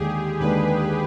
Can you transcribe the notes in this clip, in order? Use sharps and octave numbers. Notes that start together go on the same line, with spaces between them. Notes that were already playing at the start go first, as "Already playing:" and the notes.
Already playing: D#2 D3 G#3 D4 G4 G#4
D#2 D3 G#3 D4 B4